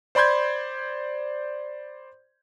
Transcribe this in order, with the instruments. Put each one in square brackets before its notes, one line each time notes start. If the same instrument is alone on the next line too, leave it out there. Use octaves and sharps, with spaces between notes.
[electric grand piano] C5 D5 B5 C6 G6 G#6